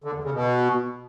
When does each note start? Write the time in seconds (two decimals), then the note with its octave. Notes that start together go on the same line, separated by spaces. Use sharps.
0.04 D3
0.14 E2
0.24 C#3
0.34 B2